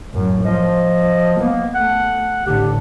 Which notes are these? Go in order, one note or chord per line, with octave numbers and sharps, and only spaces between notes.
A1 F#2
F3 D#5
A#3 B3
A3 F#5
A1 D3 G4